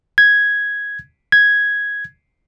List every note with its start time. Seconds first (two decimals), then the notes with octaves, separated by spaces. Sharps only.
0.18 G#6
1.32 G#6